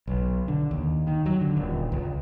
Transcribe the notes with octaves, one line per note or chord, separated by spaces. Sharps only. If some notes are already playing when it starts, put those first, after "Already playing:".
B1
D3
D#2
D#3
F#3
D3
D#1
C#2